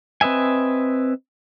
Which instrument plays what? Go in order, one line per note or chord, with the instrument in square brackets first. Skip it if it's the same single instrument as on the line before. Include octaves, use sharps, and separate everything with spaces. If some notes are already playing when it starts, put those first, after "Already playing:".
[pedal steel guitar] C4 B4 D#5 E5 G#5